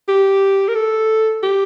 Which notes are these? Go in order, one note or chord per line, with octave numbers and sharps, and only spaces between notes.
G4
A#4
A4
G4